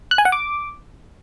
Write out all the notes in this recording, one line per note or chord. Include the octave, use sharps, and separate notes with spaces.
F#6
G#5
F#5
D6